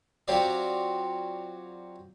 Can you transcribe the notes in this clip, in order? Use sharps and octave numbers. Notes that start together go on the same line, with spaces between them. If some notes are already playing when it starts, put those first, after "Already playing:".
F#3 C4 F4 G4 C#5 D5